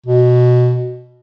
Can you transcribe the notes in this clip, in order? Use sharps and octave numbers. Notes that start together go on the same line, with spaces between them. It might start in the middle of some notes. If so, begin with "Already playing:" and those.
B2